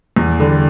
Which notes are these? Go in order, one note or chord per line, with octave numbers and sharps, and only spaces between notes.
E2
D3 G3